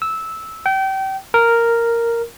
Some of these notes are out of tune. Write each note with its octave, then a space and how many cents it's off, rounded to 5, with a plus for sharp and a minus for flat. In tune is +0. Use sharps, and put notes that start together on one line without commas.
E6 -10
G5 -30
A#4 -5